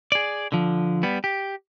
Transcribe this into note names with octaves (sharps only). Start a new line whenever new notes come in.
G#4 D5
D3 F3
G3 B3
G4